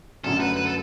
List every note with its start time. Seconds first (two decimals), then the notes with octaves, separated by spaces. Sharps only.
0.24 F#2 D3 F#3 A3 C#4 A4
0.40 B4
0.56 B4
0.67 A4